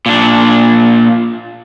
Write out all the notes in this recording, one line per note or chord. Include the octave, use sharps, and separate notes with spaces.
A#2 D4